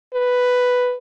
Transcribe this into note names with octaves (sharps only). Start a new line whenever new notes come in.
B4